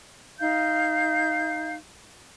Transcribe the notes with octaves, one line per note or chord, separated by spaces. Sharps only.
D#4 F5 G6